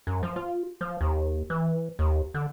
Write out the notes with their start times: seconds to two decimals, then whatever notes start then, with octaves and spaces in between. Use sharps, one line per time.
0.07 F#2
0.23 F3
0.36 F4
0.81 F3
1.01 D#2
1.50 E3
1.99 D#2
2.34 D3